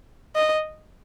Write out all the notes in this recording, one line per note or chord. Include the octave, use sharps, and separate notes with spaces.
D#5